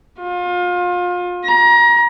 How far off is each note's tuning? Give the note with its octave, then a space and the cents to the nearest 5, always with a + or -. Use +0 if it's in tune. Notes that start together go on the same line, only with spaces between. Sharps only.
F4 +30
A#5 +30